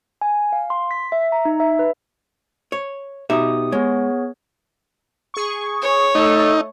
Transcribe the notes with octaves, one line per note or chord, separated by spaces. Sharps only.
G#5
F5
C6
B6
E5
A#5
D#4
E5
B4
C#5
B2 D#4 G4 E5 D#6
G#3 B3 G#4 C#5
G#4 C#6
C#5
A3 D#4 A4